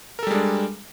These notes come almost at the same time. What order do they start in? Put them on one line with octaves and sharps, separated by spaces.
A#4 A4 G3 G#3 D4